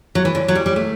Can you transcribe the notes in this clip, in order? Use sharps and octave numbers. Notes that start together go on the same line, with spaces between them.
F#3
E3
D3
F#3
G3
G3
A3